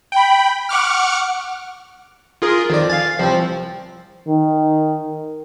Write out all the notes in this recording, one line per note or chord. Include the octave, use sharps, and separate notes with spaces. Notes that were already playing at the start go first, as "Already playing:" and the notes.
G5 B5
F#5 C#6 D6 F6
F4 G#4 A#4
F2 D#3 D5
F5 G#5 A6
C2 F3 C4
D#3